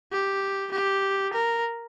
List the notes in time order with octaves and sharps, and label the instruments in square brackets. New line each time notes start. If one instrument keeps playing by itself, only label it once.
[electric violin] G4
G4
A#4